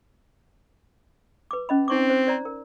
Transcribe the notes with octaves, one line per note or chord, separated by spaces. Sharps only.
B4 D6
C#4 D#5 B5
C4 D#4 C#6 D6
C5
C5 D5 A#5
A#4